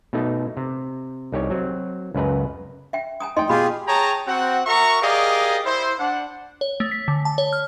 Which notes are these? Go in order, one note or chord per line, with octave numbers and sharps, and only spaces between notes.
B2 A3 D#4
C3
C2 D#4 G4 C#5
F#3 C4
C#2 F#2 B4 A#5
E5 G5
G#5 A#5 D#6
D#4 D#5 G5 C6
B2 F4 G4 G#4 B5 D#6
G#4 C#5 G5 A5 A#5
C4 F#4 F#5
F#4 A#4 E5 A#5 C#6
G4 G#4 A#4 D5 D#5 F5
E4 C5
D4 F#5
C#5
A3
B6
D3
A5
C#5
F6